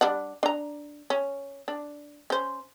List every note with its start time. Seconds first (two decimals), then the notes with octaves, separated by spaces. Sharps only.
0.01 G3 D4 F#5
0.43 D4 A#5
1.10 C#4
1.68 D4
2.30 C#4 C5